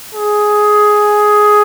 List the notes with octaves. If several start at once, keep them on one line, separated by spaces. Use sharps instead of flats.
G#4